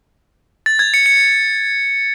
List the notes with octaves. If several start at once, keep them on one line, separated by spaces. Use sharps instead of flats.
A6
G#6
C#7
C#7